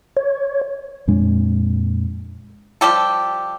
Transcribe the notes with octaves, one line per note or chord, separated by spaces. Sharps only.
C#5
F2 A#2 G#3 D4
F3 G3 G4 A4